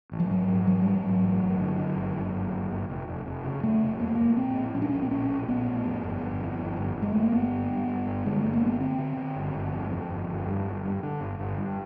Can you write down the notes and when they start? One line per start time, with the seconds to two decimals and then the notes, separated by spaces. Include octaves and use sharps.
0.12 A1
0.20 F3
0.31 G#2 F#3
0.48 G#2
0.67 A1 F#3
0.81 A1 G3
0.95 F#3
1.04 G#2
1.22 A1
1.42 G1
1.60 D3
1.78 D3
1.96 G1
2.15 G1
2.33 G1
2.52 G1
2.70 G1
2.89 F1
3.08 F1
3.26 F1
3.44 C#3
3.63 C#3 A3
3.82 F1
4.00 F2 A#3
4.08 A3
4.15 F1 A#3
4.37 A#1 C4
4.55 A2
4.74 A#1 C#4
4.82 D4
4.89 A#1 C#4
5.02 C4
5.10 A#1 C#4
5.29 A#1
5.48 A#1 B3
5.67 A2
5.85 F2
6.03 G1
6.22 G1
6.40 F2
6.59 G1
6.77 G1
6.96 G1
7.02 G#3
7.12 G1 A3
7.22 A#3
7.32 G1 B3
7.51 G2
7.70 G2
7.87 G2
8.07 G1
8.26 D3 G#3
8.40 G1 A3
8.53 A#3
8.62 D3 B3
8.80 D3 C4
8.98 D3
9.17 D3
9.36 G1
9.55 G1
9.73 F2
9.91 F2
10.10 G1
10.28 G1
10.47 G2
10.65 G1
10.84 G2
11.03 D3
11.21 G1
11.39 G1
11.58 G2